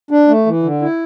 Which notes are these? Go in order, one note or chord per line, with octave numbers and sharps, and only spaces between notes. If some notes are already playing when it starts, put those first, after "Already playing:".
D4
A3
E3
D3
E4